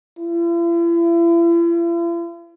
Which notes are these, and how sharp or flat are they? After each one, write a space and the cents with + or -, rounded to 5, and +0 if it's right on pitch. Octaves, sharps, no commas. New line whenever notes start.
E4 +45